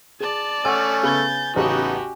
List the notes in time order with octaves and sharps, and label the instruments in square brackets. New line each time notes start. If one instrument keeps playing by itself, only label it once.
[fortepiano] G#4 [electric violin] D5 A5
[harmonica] A3 C#4 [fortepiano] F#5 D6 E6 [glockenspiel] G#5
[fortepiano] C#3 B3 [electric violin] G6 A6
[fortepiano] A1 C#3 [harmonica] B3 D#4 [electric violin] F#4 G4